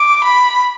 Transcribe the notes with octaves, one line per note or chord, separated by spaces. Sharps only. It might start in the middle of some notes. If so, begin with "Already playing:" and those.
Already playing: D6
B5